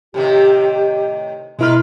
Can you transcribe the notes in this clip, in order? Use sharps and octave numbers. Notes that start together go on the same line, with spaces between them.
A2 C3 D#3 G4
B2 G#3 E4 A#4 B4 C6 F6